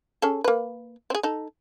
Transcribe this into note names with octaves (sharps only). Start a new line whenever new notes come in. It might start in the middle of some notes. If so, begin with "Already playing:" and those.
C#4 G#4 A4
A#3 B4
C4 G#4
D#4 A4